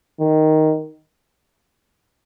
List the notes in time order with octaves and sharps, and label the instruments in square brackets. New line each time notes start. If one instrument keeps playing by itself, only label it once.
[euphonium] D#3